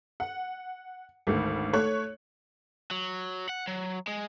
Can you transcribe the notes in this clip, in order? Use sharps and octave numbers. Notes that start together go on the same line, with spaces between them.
F#5
G#1 D2
A3 C#5 F#6
F#3
F#5
F#3
G#3